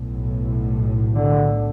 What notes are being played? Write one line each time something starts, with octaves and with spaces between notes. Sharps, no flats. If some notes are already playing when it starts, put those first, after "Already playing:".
Already playing: B1 A2
D3